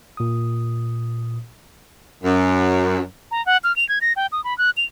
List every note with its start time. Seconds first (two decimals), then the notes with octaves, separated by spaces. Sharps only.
0.17 A#2 D#6
2.24 F#2
3.31 A#5
3.46 F#5
3.64 F6
3.76 F7
3.89 G#6
4.01 A#6
4.16 G5
4.32 D#6
4.44 B5
4.58 F#6
4.77 F7